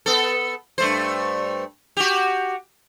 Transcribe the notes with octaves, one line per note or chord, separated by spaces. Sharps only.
B3 A4
G2 A3 C5
F#4 G4